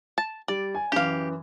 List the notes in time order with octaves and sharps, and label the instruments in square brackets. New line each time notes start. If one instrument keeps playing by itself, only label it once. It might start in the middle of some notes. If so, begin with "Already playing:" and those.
[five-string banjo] A5
[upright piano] G3 [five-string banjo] D5
[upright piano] G#5
[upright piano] F#2 E3 [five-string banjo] G4 F5